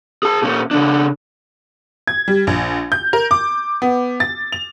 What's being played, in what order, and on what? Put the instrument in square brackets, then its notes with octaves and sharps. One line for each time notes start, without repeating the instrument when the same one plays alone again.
[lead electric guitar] G#4 A5
A#2 C#4
C#3 D4
[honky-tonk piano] G#6
G3
A#1
G6
A#4
D6
B3
A6
F7